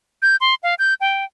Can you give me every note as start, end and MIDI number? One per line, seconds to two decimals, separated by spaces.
0.22 0.36 91
0.41 0.55 84
0.63 0.75 77
0.79 0.94 91
1.01 1.25 79